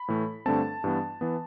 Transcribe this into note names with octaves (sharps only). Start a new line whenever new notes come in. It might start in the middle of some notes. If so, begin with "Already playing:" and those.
Already playing: B5
A2 E3 A3
G2 D3 A3 C4 A5
G2 E3 B3
E3 B3